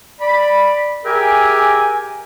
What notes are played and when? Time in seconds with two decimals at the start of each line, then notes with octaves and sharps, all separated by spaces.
0.21 D5 B5
1.05 G4 G#4 A#4 E5 G5 G#5